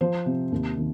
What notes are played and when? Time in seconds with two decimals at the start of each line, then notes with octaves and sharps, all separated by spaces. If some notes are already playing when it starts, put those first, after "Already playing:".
0.01 F3 C5
0.26 C3
0.52 D#2
0.77 D#3